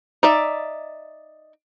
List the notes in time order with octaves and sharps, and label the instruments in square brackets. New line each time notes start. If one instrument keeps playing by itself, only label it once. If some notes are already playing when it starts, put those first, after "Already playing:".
[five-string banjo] D#4 D5 E5